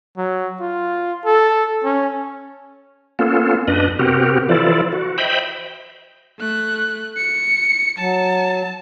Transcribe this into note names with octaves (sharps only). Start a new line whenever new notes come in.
F#3
F4
A4
C#4
A#3 B3 C#4 F4 A4
F#2 D4 B4 D#5
C3 B3 C4 F#4 G4 A#4
E3 F3 E4 F4 A4 D5
F#4
C5 D#5 E5 G5 B5
A3 F#6
C#7
F#3 A5